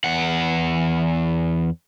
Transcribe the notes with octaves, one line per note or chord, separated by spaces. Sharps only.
E2 F#5